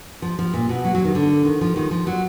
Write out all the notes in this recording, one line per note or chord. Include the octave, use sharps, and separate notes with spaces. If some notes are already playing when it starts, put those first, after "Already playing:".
F3
F3
A#2
B2
F#3
F#3
D#3
D3
D#3
F3
D#3
F3
F#3